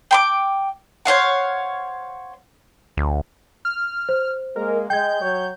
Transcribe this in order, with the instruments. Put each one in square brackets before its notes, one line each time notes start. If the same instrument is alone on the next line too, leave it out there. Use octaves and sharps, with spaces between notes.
[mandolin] G5 B5 D6
C5 C#5 F5 F#5
[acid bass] D2
[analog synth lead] F6
[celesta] C5
[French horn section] G#3 A#3 [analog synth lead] A#4
[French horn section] G#3 [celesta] G5 G#6 [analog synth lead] G6
[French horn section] F#3 C#5